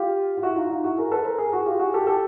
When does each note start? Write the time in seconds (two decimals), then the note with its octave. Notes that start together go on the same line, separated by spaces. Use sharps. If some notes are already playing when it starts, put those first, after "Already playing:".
Already playing: F4 G4
0.37 F4
0.43 E4 F#4
0.57 D#4 F4
0.70 D#4 F4
0.84 E4 F#4
0.97 G#4 A#4
1.12 A4 B4
1.25 A#4 C5
1.38 G#4 A#4
1.52 F#4 G#4
1.66 F4 G4
1.79 F#4 G#4
1.94 G4 A4
2.07 G4 A4